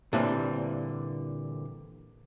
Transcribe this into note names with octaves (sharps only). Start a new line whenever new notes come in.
A#2 D3 E3 G3 C4